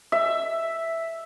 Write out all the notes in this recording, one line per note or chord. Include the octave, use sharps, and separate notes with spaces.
E5